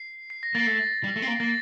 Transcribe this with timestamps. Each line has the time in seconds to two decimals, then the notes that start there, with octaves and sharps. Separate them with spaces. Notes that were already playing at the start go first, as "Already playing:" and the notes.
Already playing: C7
0.30 C7
0.43 A#6
0.55 A#3 A6
0.66 A3 A6
1.04 G3
1.16 A3
1.22 C4
1.27 A#3
1.40 A#3 A6